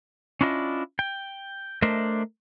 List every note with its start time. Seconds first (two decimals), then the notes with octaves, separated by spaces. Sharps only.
0.41 C#4 D4 E4 F4 D#5
0.99 G5
1.82 A3 D4 A#4 C5 D#5 E5